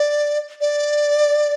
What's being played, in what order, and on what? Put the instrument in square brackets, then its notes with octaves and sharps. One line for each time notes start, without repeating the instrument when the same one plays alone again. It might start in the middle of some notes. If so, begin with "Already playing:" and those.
Already playing: [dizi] D5
D5